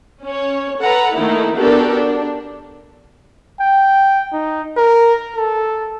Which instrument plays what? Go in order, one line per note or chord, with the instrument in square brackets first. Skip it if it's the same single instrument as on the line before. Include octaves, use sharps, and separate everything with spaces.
[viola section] C#4 C#5
A4 B4 F#5 A#5
D#3 A3 A#3 D#4 E4
B3 D4 F#4 G4 A4 A#4
D4
[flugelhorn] G5
D#4
A#4
A4